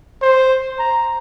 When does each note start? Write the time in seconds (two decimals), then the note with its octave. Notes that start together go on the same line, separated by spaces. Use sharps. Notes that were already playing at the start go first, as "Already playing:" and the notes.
0.22 C5
0.79 A#5